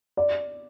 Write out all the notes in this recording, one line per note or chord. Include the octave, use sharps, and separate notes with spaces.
D5